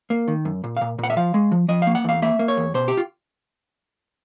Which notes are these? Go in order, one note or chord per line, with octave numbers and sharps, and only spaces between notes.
A#3
D#3
F#2
A#2
A#2 F5
A#2
F#5
E5
F3 F5
G#3
F3
F3 D#5
A#3 F5
F#5
E2 F5
A#3 E5
A#3
C#5
E2
B2 C5
G4
F4